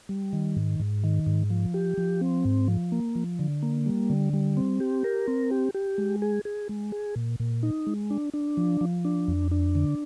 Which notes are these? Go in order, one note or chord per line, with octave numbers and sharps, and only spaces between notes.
G3
D#3
G#2
G#2
D#3
G#2
F3
G4
F3
C4
G#2
F3
A#3
F3
D3
A#3
G3
D3
G3
C4
G4
A#4
C4
G4
G4
G#3
G#4
G#4
G#3
G#4
A#2
A#2
D#4
G#3
D4
D4
F3
F3
D4
F2
D4
D3